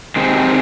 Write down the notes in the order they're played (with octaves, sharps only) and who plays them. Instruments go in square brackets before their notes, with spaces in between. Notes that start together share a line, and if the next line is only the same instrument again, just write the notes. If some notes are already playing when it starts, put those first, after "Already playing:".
[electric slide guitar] C3 D#3 G#3 C4